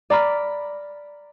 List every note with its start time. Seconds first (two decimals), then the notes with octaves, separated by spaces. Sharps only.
0.10 D5 A#5 B5 F6 B6